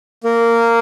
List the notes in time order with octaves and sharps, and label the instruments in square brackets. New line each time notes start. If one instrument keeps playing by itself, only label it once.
[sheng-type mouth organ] A#3 A#4